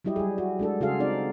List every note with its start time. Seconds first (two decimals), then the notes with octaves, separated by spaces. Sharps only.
0.05 F#3 G3 E4 G4 D#5
0.16 G3 G#4
0.38 F#4
0.59 G#3 D4 A4
0.81 C#3 F4 F#4 G#4 A4 F5
0.99 C4 D#4 D5